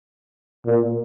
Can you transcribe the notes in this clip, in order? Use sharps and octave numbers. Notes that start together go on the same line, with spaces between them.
A#2